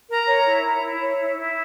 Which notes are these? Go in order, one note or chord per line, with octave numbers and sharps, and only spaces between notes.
A#4 A#5
C#5
E4
E4
E4
C#5
E4
E4